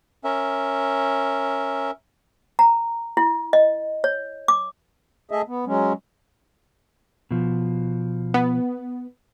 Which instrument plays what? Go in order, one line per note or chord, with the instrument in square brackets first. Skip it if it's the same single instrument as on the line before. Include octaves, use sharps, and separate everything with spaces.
[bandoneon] C#4 A#4 E5
[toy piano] A#5
E4
D#5
C#5
D6
[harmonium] A3 G#4 D#5 E5
B3
F#3 G#3 C#4
[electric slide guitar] B2 F3
[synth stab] B3